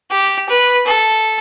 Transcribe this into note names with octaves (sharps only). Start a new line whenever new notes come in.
G4
B4
A4